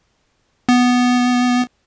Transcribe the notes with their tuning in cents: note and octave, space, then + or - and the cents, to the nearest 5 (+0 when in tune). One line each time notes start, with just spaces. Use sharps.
B3 +0